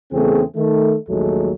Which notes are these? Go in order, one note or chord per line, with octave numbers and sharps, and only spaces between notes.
E2 C#3 A3 C4 G#4
D#3 A3
A#1 D#2 F#3 G#3 A3